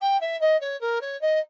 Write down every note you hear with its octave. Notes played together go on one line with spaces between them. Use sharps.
G5
E5
D#5
C#5
A#4
C#5
D#5